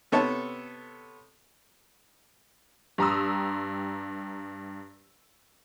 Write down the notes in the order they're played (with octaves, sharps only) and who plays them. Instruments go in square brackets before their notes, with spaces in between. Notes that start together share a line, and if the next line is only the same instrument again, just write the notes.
[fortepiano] C3 B3 A4 C#5 A5
[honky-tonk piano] G2 G4 A#5 C6 D#6 E6